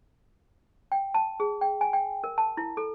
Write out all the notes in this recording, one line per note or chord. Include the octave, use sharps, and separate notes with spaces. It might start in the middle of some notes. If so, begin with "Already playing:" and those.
G5
A5
G#4
G5
G#5
G5
A#4
A5
E4
A4